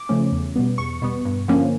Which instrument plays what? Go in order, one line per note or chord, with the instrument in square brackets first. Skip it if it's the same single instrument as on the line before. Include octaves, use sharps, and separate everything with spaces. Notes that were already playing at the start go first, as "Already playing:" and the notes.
Already playing: [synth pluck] D6
C#3 F3 A3 C#4
E2
B2 G3 B3
E2 C#6
B2 G3 B3
G2
D3 F3 A#3 C#4